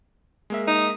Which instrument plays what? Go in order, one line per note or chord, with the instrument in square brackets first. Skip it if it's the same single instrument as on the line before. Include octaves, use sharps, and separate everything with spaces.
[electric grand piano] G#3 A#3 E5
[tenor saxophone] D#4